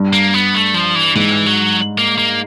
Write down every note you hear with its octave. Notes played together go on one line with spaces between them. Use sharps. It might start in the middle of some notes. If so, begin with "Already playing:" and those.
Already playing: G2
A#3
B3
A3
F3
E3
G#2 E3
F#3
A#3
A#3